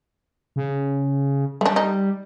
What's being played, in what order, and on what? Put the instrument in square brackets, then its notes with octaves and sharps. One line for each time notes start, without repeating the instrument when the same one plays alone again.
[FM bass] C#3
[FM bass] G3 [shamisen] A3 D4
[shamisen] D#4